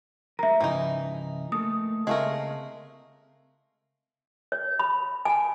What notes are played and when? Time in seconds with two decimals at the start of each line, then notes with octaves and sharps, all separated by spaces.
0.39 G#3 A#4 E5 A#5
0.60 G#2 C#3 E3 F3 D#4
1.52 A3 A#3 A4 D#6
2.07 C#3 G#3 A3 C4 A#4 F5
4.52 C#5
4.79 B5
5.25 G#5